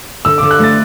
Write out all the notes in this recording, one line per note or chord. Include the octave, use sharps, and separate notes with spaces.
D3 E6
D3 D6
F#6
A3 A6